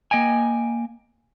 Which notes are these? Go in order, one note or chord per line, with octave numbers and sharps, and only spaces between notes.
A#3 D#5 G5 G#5